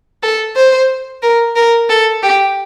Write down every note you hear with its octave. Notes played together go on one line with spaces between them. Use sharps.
A4
C5
A#4
A#4
A4
G4